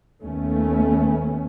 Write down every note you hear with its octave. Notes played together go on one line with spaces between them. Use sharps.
D#2 D#3 A3 B3 C#4